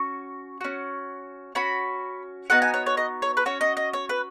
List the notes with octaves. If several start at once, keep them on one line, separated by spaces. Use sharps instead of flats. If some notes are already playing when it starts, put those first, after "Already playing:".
Already playing: C#4 F#4 C#6
C#4 F#4
C#4 F#4 B5
B3 D#4 F#4 F#5
G#5
C#5
C#5
D#5
C#5
B4
C#4 F#4 C#5
D#5
D#5
C#5
B4